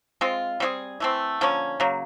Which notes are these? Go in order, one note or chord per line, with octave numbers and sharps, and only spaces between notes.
G#3 C4 F4
G3 C4 F4 G#4
E3 A3 C4
D3 F3 A#3 C#4
C#3 F#3 A#3